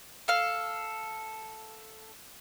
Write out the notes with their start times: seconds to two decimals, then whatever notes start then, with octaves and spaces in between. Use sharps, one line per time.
0.28 A4 F5